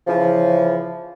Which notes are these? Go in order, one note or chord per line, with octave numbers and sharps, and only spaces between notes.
C#3 E3 F3